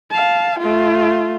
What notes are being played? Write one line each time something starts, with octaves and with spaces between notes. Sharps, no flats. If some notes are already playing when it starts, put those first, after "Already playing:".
F5 A5
A3 F4